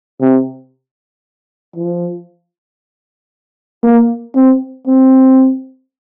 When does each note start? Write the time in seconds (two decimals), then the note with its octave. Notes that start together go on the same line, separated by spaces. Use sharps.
0.21 C3
1.76 F3
3.83 A#3
4.35 C4
4.87 C4